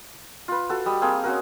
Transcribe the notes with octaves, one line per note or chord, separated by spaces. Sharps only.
F4 B4
F#4 A4
G3 D#5 E6
A#3 C4 G#4 F5
C#4 F#4 A#4